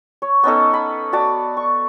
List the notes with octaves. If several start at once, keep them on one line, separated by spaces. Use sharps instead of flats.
C#5
B3 C#4 D#4 A4
B5
F#4 D5 A5
C#6